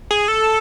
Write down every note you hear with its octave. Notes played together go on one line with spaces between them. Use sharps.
G#4
A4